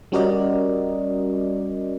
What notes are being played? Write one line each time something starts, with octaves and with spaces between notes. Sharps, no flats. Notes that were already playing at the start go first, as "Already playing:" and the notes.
G3 C#4 F#4 A#4 D5 D#5